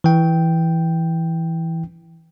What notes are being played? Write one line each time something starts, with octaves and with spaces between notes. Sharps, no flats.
E3 G5